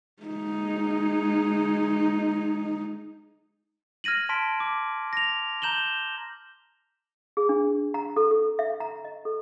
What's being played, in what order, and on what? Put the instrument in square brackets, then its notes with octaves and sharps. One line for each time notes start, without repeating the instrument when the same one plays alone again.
[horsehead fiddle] G#3 D#4
[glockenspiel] F6 G#6 A#6 D#7 F#7
A5 C6 B6 D7
D6
A#6 F7
A#5 G6 E7 F#7 G7
[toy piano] G#4
D4
A#5
A4
A4
E5
A#5
D#5
A4